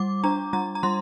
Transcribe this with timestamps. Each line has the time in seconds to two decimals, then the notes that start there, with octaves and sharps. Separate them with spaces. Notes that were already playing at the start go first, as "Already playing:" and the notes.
Already playing: G3 D6
0.24 D4 A#5
0.53 G3 A#5
0.75 A#5
0.83 G3 C6